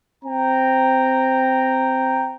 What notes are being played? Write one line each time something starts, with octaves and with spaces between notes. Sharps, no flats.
C4 G5 A#5